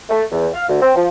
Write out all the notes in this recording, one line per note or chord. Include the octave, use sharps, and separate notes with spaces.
A3
E2
F5
D2
C4
F3